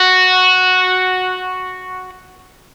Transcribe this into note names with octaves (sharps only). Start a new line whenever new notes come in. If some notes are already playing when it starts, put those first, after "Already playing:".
Already playing: F#4